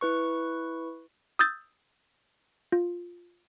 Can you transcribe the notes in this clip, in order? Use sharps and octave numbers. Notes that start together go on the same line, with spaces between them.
E4 B4 C#6
D#6 E6 G6 A6
F4